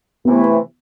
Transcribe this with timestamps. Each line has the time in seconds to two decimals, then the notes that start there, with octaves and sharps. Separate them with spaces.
0.25 C3 E3 A3 B3 E4